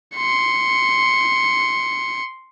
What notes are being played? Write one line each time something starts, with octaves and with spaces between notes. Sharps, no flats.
C6 C#7